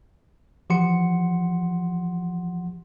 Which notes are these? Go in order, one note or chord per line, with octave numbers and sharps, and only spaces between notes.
E3 F3 G4 F#5 C6 C#7